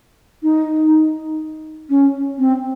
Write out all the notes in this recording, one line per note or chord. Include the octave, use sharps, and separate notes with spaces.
D#4
C#4
C4